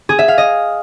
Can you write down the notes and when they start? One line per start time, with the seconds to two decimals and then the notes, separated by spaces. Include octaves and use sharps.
0.09 G#4
0.19 E5
0.28 F5
0.38 D#5